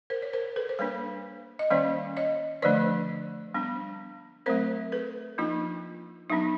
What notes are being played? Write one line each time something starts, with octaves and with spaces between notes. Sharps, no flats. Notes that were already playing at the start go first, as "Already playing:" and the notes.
A#4 C5
C#5
A#4 C5
A4 B4
C5
G3 A#3 D4 B4 C#5
D#5
D#3 G3 A#3 C#4 C5 D5
C#5 D#5
D3 F3 A3 D4 C5 D5
G3 B3 D4
F#3 A3 C4 A#4 C5
A4 B4
F3 A#3 D4 D#4 F4
F#3 B3 D4 D#4